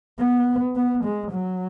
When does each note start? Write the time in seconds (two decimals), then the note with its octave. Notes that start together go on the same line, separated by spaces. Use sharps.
0.19 B3
0.76 B3
1.04 G#3
1.32 F#3